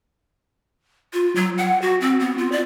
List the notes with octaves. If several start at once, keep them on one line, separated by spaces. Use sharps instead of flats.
F4
F#3
F#5
F#4
C4
B3
F4
D5